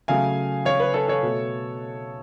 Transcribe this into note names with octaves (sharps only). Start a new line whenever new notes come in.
C#3 F#3 A3 F5 G#5
C#5 F5
B4
A4 C#5
A4 C#5
B2 A3